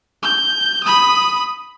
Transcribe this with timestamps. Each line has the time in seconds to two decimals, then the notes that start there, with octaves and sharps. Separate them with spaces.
0.23 G6
0.84 B5 D#6